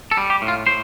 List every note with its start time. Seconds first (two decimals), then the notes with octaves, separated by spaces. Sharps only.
0.11 A4
0.17 G3
0.30 G4
0.42 A2
0.48 F4
0.67 A2 C5